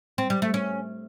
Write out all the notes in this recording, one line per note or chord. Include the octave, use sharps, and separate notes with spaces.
C4
G3
A3
C#4